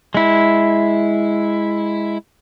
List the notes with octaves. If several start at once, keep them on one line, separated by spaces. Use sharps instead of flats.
G#3 E4